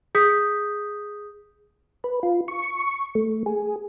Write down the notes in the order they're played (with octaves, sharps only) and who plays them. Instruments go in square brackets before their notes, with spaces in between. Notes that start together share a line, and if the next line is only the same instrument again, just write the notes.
[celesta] G#4 D#6 G6 B6
[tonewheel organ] B4
F4
C#6
A3
G#4